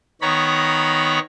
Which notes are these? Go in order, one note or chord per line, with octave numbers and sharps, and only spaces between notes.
D#3 B3 C#5 A#5 B5